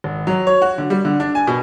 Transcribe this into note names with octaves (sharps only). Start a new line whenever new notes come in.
G#1
F#3
C#5
F#4
D3
G3
D3
D4
G#5
B2